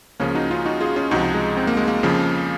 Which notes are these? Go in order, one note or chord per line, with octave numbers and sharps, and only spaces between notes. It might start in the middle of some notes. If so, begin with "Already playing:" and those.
C#2 C#3 F3 A#3 C#4
D#4 F#4
C#4 F4
D#4 F#4
F4 G#4
C#4 F4
C#2 C3 F3 D#4 F#4
G#3
C4
A#3
G#3
A#3
F2 C#3 F3